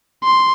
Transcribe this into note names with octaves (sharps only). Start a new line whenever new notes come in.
C6